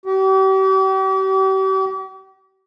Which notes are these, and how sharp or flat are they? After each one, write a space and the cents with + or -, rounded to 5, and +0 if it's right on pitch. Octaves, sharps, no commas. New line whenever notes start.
G4 -40